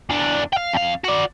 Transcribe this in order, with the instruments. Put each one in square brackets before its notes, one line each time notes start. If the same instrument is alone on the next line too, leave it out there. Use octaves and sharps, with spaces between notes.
[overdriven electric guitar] E2 D4
F5 G5
F2 F5
F#4 D5